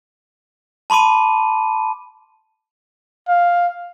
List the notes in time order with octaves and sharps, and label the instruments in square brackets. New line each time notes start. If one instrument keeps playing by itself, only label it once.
[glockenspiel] A5 B5 C6 D6 D#7
[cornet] F5